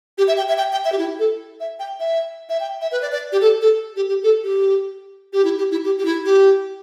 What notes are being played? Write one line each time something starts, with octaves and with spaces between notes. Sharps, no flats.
G4
E5
G5
E5
G5
G5
E5
G4
E4
A4
E5
G5
E5
E5
G5
E5
B4
D5
D5
G4
A4
A4
G4
G4
A4
G4
G4
E4
G4
E4
G4
G4
E4
G4